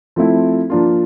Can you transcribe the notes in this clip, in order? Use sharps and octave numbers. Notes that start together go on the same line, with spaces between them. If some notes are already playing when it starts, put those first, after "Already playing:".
F3 A3 C4 E4
F3 A#3 D4 F4